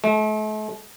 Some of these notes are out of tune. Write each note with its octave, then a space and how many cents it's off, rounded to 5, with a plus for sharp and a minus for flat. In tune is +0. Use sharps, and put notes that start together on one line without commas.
A3 -40